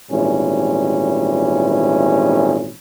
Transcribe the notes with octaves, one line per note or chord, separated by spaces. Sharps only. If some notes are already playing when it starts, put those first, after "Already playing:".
G#1 A#2 E3 G3 C#4